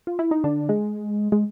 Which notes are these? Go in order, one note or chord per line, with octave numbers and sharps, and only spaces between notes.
F4
E4
D#4
D3 D4
G#3
G#3